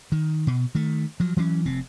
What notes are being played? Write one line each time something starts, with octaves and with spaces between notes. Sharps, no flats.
D#3
B2
D#3 A3
F3 F#3
E3 F#3 G#3 C#4
F1 C3 C4